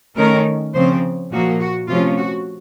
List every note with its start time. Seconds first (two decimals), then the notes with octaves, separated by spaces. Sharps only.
0.17 D#3 A3 C#4 A#4
0.74 C#3 F3 C4 C5
1.31 A#2 F3 A#3 F#4
1.60 F#4
1.88 C3 F3 A3 C#4 F4
2.18 F#4